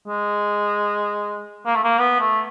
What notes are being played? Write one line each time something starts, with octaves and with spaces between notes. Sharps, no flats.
G#3
A#3
A3
A#3
B3
A3